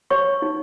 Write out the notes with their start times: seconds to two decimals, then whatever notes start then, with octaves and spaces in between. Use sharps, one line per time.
0.11 C#5 C#6
0.42 D#4